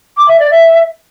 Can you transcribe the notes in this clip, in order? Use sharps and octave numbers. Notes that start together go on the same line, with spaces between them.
D6
E5
D5
E5